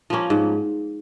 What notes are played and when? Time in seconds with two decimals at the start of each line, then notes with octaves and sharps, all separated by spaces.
0.10 F3 A#3 C#4
0.30 G#2